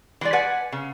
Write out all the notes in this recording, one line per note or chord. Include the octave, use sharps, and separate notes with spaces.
E3 G#3 D5
B4 D5 F#5 G#5
C#3